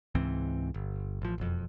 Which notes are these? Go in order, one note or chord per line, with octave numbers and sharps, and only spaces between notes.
C#2 G#2 E3 C4
G1
A1 F3
E1 F2